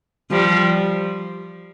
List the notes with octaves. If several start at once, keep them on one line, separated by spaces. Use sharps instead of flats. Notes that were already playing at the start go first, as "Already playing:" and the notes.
F3 G3